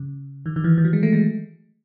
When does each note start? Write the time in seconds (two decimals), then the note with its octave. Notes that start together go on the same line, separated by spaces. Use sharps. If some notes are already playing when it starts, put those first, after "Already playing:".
Already playing: C#3
0.46 D#3
0.56 D#3
0.64 E3
0.78 E3
0.85 F#3
0.93 G#3
1.03 A3
1.13 G#3